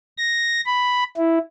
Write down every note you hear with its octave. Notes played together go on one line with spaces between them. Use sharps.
A#6
B5
E4